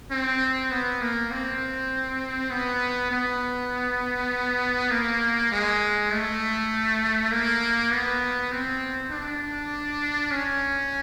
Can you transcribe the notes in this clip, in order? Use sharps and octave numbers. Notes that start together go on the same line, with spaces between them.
C4
B3
A#3
C4
B3
B3
A#3
G#3
A3
A#3
B3
C4
D4
C#4